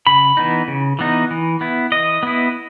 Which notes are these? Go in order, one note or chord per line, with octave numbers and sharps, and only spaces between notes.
C#3 B5
E3 B3 D#4
C#3
E3 B3 D#4
E3
B3 E4
E3 D#5
B3 E4